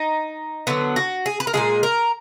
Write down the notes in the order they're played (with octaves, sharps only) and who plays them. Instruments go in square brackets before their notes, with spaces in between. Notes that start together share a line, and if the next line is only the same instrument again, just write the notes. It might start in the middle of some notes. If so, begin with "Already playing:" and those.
Already playing: [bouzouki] D#4
D3 F#3 B3
F#4
G#4
B4
A#4
A#2 F3 G#3 G#4
A#4